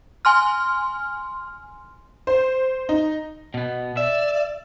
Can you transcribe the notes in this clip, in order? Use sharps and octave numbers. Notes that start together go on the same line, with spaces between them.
G#5 C6 F6
C5
D#4
B2 B3
D5 E5